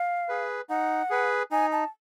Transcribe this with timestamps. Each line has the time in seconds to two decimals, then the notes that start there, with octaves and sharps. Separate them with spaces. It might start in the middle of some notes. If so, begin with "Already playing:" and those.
Already playing: F5
0.29 G#4 B4
0.69 D#4 F#5
1.10 G#4 B4
1.51 D#4 G#5
1.72 A5